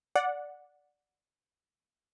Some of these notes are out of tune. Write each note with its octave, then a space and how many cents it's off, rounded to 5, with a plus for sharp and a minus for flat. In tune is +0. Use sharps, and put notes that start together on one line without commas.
D5 -5 F#5 -15